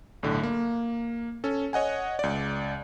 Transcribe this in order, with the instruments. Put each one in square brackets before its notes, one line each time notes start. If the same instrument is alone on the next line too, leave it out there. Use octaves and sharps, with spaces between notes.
[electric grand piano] B1 A2 D3
A#3
C#4 A4
C#5 D#5 F#5 G#5
C#2 D5